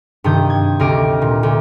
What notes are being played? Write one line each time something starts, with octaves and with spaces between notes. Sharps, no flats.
G2 C3 D#3 D#6 G6
G#6
D2 C3 D#5 F6 D7
A#2
D2